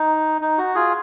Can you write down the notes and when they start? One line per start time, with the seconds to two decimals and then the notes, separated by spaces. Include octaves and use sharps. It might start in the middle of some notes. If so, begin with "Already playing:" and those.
Already playing: D#4
0.41 D#4
0.58 F#4
0.75 F4 G#4